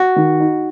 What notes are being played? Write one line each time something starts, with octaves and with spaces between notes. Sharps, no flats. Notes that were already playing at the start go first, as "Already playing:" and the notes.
Already playing: F#4
D#3
D#4